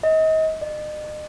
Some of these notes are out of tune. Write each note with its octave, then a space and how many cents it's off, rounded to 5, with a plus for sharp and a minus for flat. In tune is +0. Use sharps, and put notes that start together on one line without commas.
D#5 +30
D#5 -40